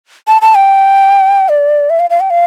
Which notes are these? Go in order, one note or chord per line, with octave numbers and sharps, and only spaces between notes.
A5
A5
G5
D5
E5
F5
F5
G5
F5